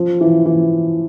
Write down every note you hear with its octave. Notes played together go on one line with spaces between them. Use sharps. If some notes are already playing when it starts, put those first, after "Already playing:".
Already playing: F3
E3
E3